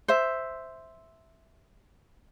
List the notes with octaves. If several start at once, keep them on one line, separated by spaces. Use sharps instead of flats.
C5 E5